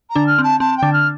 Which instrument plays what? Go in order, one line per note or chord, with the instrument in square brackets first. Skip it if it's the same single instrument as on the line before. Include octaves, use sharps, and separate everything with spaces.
[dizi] A#5
[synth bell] D3 D4
[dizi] F6
[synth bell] C4 [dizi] A5
[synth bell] C4 [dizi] A5
[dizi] G5
[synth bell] D3 D4
[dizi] F6